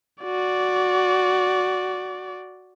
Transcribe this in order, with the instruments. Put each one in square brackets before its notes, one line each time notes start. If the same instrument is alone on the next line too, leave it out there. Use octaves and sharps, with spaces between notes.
[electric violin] F#4 D5